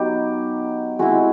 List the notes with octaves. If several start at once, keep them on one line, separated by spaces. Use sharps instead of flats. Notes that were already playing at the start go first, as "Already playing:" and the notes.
Already playing: F#3 B3 D#4 G4
G#3 C4 E4 F#4